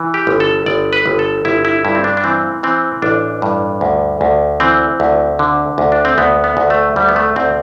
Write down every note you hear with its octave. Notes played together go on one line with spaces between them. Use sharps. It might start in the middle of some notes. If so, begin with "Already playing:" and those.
Already playing: E3
G4
G1
A4
G1 D5
B4
G1
A4
G1 E4
E4
G2 E4
C4
D4
D4
E3 C4
E3 C4
A1 D4
G2
D2
D2
E3 C4
D2
D3
D2
D4
C4
D2 B3
B3
D2
A3
D2 G3
B3
A3
D2 C4